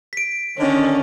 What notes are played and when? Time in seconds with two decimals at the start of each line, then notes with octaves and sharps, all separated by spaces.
0.13 B6 D7
0.58 D3 D#3 C#4